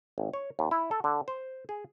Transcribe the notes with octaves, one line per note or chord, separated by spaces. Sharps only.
G#1
C#5
D#2
E4
A4
D3
C5
G#4